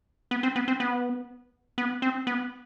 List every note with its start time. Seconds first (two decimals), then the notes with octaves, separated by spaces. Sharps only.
0.31 B3
0.43 C4
0.56 B3
0.68 C4
0.80 B3
1.78 B3
2.02 C4
2.27 B3